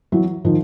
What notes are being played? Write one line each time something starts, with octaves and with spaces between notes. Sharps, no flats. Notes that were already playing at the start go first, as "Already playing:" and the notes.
E3 F#3
D#3 F3